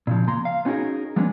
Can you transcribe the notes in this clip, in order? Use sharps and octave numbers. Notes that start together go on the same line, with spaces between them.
A#2 C#3 F3
A#3 A#5 C6
F5
B3 C#4 D#4 F#4 G#4 A#4
F3 G#3 A#3 B3 C#4 D4